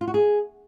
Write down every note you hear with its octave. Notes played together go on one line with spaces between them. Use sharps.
F4
F#4
G#4